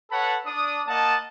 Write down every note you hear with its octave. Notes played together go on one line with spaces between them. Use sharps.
A4 B4 C#5 F#5 A5 B5
D4 D#6
A#3 D#5 F#5 A5